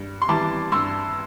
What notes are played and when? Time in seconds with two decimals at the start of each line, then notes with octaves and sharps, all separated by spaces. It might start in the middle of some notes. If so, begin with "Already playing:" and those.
Already playing: G2
0.22 C6
0.28 E3 G3 A5 D6
0.72 G2 C6 E6